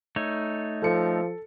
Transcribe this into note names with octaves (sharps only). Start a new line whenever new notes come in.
A3 D#4 C#5
F3 A4 C#7